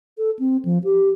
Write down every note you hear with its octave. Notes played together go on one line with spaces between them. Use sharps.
A4
C4
F3
G4